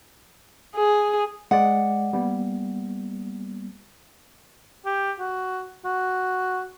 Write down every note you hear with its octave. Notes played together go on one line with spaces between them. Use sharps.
G#4
G#3 D5 F#5
G3 A#3 B3
G4
F#4
F#4